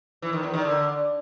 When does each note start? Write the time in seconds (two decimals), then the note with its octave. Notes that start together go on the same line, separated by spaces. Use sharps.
0.22 E3
0.33 D#3
0.43 E2
0.54 D#3
0.64 D3